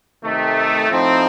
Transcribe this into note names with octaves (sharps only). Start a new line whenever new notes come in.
C3 D#3 A3
A2 F3 C4 D#4